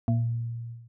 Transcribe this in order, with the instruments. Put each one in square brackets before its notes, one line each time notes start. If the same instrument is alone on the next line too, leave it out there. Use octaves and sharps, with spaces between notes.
[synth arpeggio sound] A#2